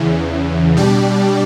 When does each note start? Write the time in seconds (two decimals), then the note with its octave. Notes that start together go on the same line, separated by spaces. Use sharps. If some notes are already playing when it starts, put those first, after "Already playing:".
Already playing: E2 C#3 E3
0.77 B2 G3 D4 G4 D5